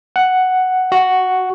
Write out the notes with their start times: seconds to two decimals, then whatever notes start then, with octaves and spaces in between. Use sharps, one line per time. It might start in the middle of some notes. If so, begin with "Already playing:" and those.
0.16 F#5
0.92 F#4